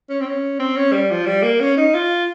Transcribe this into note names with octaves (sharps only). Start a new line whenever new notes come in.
C#4
C4
C#4
C4
C#4
G3
F3
G3
A#3
C#4
D#4
F4